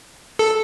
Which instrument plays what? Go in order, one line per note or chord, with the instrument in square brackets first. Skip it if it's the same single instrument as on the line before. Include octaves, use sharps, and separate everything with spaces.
[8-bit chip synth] A4